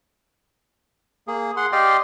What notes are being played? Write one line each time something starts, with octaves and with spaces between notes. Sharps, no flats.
A#3 G#4
G#4 F#5 C6
G4 D5 D#5 F5 G5 C6